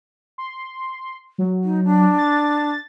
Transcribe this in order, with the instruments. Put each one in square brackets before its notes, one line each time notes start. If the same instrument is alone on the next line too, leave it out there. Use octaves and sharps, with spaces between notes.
[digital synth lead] C6
F#3
[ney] D#4
D4
[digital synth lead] A6